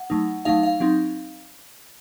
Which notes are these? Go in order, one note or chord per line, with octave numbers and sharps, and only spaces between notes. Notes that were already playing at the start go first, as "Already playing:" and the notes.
Already playing: F#5
F#3 A3 D#4
F#3 A3 D#4 F5
F5
F#3 C4 D#4